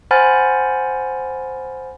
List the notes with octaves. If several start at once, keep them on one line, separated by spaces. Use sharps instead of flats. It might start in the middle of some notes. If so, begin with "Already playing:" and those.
C5 F#5 G#5 B5 F6 A6